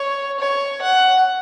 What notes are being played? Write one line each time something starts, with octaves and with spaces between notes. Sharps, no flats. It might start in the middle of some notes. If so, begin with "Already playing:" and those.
Already playing: C#5
C#5
F#5